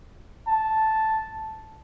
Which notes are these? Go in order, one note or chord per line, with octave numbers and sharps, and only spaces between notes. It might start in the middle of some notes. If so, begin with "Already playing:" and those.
A5